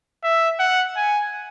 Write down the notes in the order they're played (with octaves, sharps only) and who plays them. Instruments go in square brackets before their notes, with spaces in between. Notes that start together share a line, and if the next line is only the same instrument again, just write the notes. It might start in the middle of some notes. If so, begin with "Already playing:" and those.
[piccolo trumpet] E5
F#5
G#5